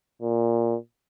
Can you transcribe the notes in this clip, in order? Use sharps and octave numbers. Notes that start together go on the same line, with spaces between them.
A#2